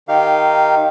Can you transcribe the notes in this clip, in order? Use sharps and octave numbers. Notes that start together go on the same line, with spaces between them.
D#3 D#4 G4 F5